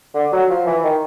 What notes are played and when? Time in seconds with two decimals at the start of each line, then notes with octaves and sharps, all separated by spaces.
0.14 D3
0.32 F#3
0.50 F3
0.67 E3
0.84 D#3